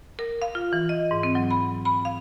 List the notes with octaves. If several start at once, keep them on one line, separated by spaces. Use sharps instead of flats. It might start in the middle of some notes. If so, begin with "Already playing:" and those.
A#4
F5
F4
E3
D#5
G#2
C4
F#3
B5
B5
F5